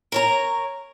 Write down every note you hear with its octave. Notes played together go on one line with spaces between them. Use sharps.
A#4 C#5 A#5